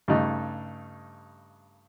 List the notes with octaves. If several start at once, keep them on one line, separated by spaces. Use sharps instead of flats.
G2 C#3 A3 D#4